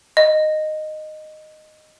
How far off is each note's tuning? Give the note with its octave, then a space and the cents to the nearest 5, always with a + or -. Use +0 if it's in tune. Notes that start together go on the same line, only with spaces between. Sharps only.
D#5 -10